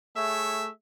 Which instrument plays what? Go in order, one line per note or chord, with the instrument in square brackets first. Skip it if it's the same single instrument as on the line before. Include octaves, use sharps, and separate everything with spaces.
[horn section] A3 G#4 C#5 E5